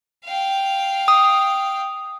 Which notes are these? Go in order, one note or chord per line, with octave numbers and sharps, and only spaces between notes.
F5 G5
D#6